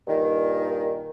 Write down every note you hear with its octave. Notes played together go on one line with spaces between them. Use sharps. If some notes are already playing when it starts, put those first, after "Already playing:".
G2 A#2 D#3